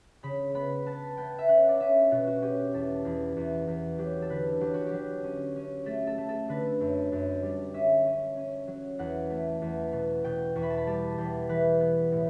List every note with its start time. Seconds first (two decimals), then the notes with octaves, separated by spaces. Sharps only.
0.23 C#3 B5
0.55 B3 B5
0.86 B3 A5
1.17 B3 G5
1.39 E5
1.48 C#4 F#5
1.68 D5
1.80 C#4 E5
2.11 B2 F#4
2.27 F#4
2.42 C#4 G4
2.73 E2 A4
3.05 E2
3.36 E2
3.68 E2
3.99 F#3 G4
4.22 A4
4.30 D3 B4
4.61 F#3 G4
4.74 F#4
4.87 G4
4.93 F#3
5.24 C#4
5.56 C#4
5.86 A3 A4
6.07 A4
6.18 A3
6.29 A4
6.49 D3 B4
6.80 F#2
7.12 F#2
7.43 G3
7.74 C#4 E5
8.05 C#4
8.37 C#4
8.67 F#3
8.99 E2 F#5
9.30 A3
9.62 E2
9.93 B2
10.24 B2 G5
10.56 E2 C#6
10.63 B5
10.70 A5
10.78 B5
10.87 G3 A5
11.18 E2 G5
11.49 E3 B4
11.80 B3
12.12 A2